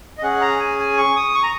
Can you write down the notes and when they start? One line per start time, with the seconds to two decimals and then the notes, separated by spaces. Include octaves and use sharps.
0.18 D#5
0.22 C#4 G#4 F#5
0.41 A#5
0.59 G#5
0.79 G#5
0.98 C#6
1.16 D#6
1.35 C#6
1.43 A#5